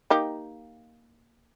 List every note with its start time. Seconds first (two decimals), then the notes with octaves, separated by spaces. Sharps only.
0.10 A#3 D#4 G4